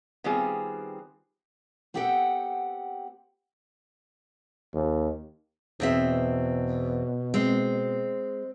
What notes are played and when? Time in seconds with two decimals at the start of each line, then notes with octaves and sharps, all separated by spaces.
0.24 D#3 G3 B3 C4 F4 G#4
1.94 B3 C4 G4 A4 F#5 G5
4.74 D#2
5.80 E2 B2 C4 E5
7.34 G#3 C4